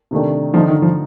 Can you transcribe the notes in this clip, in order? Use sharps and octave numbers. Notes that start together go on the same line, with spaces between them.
C3 D#3 A3 D4
D3 F3 A3 D#4
D#3
F3